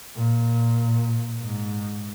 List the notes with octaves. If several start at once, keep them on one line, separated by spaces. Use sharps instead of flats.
A#2
G#2